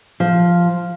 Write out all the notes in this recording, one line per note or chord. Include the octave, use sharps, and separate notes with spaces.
F3